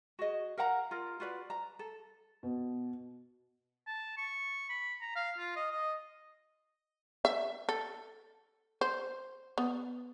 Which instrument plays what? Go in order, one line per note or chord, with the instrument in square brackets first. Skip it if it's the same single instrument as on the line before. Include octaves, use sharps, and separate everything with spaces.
[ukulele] F#4 G#4 D#5
A#4 F5 F#5 A#5
F4 A#4
F4 F#4 B4 D5
A#5
A4
[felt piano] B2
[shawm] A5
C#6
B5
A#5
F5
F4
D#5
D#5
[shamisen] E5
A4
C5
B3